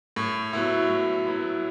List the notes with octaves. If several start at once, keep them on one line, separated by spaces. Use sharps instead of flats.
A2
F#3 B3 E4
A2
F#3 B3 E4